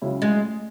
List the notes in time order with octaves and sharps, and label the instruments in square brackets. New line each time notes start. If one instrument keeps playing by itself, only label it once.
[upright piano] C#2 C#3 F#3 E4 C#5
[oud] G#3